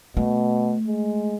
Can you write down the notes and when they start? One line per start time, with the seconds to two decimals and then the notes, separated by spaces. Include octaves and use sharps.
0.17 B2 A3
0.87 G#3